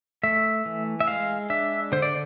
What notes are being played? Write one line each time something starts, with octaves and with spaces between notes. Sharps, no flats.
A3 E5
E3
E5
G#3 F5
D4 E5
D3 C5
D5